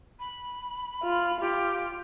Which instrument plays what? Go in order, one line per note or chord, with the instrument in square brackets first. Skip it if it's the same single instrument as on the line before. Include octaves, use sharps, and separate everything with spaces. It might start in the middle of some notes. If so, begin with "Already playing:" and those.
[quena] B5
[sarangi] F4
[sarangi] F4 [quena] G4